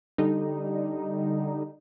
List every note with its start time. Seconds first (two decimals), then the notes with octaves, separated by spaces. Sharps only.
0.18 D3 G3 D#4